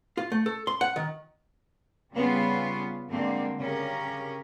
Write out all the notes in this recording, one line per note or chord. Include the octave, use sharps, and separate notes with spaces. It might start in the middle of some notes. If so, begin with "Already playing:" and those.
F4
A3
A4
C6
F#5
D#3
C#3 G3 B3 C#4 F4
G2 D3 G#3 A#3 C4
C#3 C#4 G4 A#4